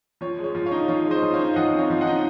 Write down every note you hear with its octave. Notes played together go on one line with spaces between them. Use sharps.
F3 C#5
G#3
C#5
F3
C#5 F5
D#4
F3 C#5 F5
G#3
C5 D#5
F3
C#5 F5
D#4
F3 D#5 F#5
C4
C#5 F5
F3
D#5 F#5
D#4